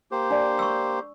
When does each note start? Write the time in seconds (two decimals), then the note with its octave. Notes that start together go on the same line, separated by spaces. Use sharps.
0.11 A#3 G4 C5
0.31 D4 D5
0.59 C#6 E6